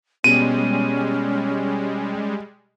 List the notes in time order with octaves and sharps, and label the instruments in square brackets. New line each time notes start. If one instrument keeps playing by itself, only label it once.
[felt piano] B2 [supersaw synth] G3 G#3 [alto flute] C#4 [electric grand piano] D#7